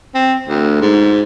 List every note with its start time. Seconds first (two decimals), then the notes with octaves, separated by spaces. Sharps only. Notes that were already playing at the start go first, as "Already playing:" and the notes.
0.14 C4
0.48 D2
0.81 G#2